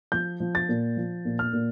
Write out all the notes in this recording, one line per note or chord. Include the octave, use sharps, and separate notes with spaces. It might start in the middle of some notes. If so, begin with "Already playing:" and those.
F3 G6
F3
A6
A#2
F3
A#2
F6
A#2